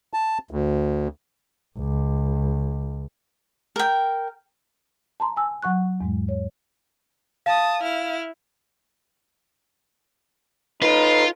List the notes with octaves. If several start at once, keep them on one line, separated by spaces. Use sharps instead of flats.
A5
D2
C#2
A#4 G5
A5 A#5 C6
G#5 E6
F#3 F#5 C#6 F#6
E2 G#2 G#3
C#5
F5 A5 D#6
E4 F6
D#4 F4 A4 B4